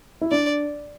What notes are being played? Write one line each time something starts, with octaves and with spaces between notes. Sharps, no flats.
E4
D4 D5